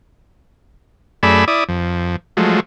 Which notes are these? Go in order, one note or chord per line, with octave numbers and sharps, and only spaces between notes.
F#2 A3 G#4 D5 B5 E6
E4 D5 D#6
F2
F3 F#3 G#3 A3